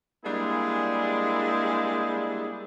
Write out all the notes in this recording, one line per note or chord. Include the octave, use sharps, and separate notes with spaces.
G3 G#3 A#3 D4 E4 G#4